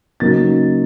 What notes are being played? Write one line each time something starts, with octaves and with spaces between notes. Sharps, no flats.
C#3 F#3 A#3 D#4 A6